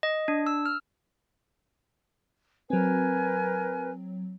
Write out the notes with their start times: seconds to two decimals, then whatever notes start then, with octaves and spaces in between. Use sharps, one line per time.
0.03 D#5
0.28 D4
0.47 E6
0.66 F6
2.70 F#3 C4 A#4 B4 G#5